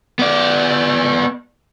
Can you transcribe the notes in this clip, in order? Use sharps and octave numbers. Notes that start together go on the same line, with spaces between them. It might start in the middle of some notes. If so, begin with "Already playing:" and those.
B3 D5